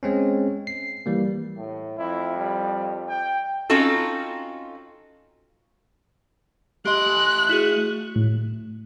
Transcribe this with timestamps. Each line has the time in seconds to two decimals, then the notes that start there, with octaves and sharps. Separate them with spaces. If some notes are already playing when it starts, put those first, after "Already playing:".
0.03 G#3 C4 C#4
0.67 C7
1.06 E3 G3 A#3
1.57 A2
1.98 F2 E4
2.37 G3
3.09 G5
3.70 C4 C#4 D#4 F4 F#4 A4
6.85 A3 G4 D#5 C6 F#6
7.49 E4 F#4 G#4
8.16 A2